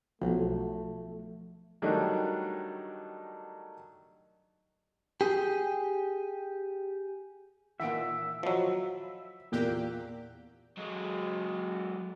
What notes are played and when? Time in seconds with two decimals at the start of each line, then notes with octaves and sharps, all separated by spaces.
0.22 B1 F3 A3
1.82 D#3 F#3 G3 A3 D4 D#4
5.21 G4 G#4
7.80 A#2 D#3 E3 E5 F#5 D7
8.43 F3 F#3 D#5 B5
9.52 E2 A#2 A#3 G4 F#6
10.77 F#3 G#3